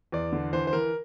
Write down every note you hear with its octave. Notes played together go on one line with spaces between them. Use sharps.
E2 D5
D3
E3 C5
C5
E3 A#4